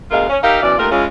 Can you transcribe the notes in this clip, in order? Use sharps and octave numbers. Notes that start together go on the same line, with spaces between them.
D2 B2 G#3 F4 A#4 F5
C#4
D#4 G4 A#4 E5 F5
F#2 B2 E3 D5
D#2 A3 F4 A#4
C#3 G#3 C#4 E4 F4